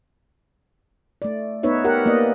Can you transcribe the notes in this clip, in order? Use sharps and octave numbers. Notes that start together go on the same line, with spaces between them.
A3 D5
B3 D#4 B4 C#5 E5
G4 A#4 F#5
A#3 B3 D5 D#5